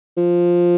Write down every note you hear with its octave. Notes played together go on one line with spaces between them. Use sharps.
F3